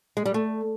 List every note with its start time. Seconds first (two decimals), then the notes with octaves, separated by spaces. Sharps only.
0.17 G#3
0.25 G3
0.34 A3